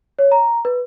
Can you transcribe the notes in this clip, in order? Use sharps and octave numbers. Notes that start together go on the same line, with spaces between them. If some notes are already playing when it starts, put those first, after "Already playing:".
C#5
A#5
B4